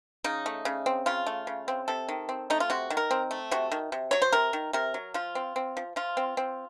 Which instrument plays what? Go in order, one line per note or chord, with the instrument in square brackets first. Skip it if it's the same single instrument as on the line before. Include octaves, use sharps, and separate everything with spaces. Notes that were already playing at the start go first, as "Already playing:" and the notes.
[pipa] C#3 D#4
A3
C#3
C4
C#3 F4
A3
C#3
C4
C3 A4
D#3
C4
A3 D#4
F4
C3 F#4
D#3
A#4
C4
A3
C3 F#4
D#3
C3
F#3 C#5
C5
C3 A#4
D#3
C3 A#4
F#3
F3 F4
C4
C4
F3
F3 F4
C4
C4